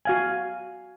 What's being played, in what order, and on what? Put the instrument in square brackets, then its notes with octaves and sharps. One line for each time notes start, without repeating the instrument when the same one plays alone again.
[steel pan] F#4 F5 G#5